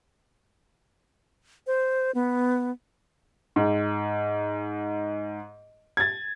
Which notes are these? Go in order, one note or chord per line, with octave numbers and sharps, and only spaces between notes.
C5
B3
G#2
G#6 A6